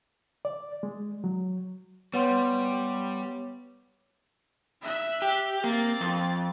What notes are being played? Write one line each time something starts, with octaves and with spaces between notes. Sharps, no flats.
D5
G#3
F#3
G3 B3 B4 C#5 F#5 C6
E5 F#6
G4
A#3 C4 A6
F2